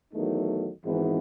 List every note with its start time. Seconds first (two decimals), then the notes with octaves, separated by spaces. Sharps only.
0.12 E2 D#3 F#3 A3 D#4
0.84 G#1 G#2 E3 B3 D#4